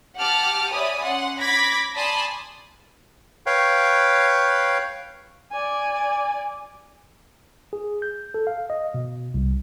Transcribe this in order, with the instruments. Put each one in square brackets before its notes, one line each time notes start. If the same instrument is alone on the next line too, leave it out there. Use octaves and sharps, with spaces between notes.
[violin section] G4 F#5 A5 D6 F6
C#5 D5 E5 G#5 B5 D#6
C#4 F#5 C6
B5 D6 G#6 A#6 B6
D5 G#5 A5 B5 C6 D#6
[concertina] B4 C#5 F5 G5
[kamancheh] D5 G#5
[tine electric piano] G#4
G6
A4
F5
D#5
B2
C2